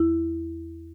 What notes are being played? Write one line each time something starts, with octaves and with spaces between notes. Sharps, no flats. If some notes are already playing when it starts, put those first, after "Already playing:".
Already playing: E2 E4